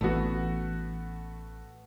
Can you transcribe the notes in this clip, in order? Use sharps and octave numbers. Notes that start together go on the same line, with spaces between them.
A1 E3 A3 B3 F#4